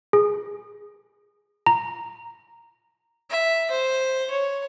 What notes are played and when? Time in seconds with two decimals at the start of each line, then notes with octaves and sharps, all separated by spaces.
0.13 G#4
1.66 A#5
3.30 E5
3.70 C5
4.30 C#5